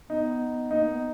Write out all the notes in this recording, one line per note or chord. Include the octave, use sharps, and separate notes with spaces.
B3 D#4
A#3 D#4
B3